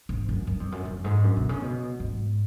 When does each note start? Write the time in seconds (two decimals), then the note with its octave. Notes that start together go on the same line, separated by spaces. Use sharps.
0.09 G#2
0.29 F#2
0.47 F#2
0.60 F2
0.72 F#2
0.85 F#2
1.04 G#2
1.24 F#2
1.37 B2
1.49 C#3
1.62 B2
2.00 G#2